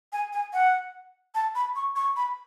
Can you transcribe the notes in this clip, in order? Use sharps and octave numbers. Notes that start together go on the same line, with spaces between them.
G#5
G#5
F#5
A5
B5
C#6
C#6
B5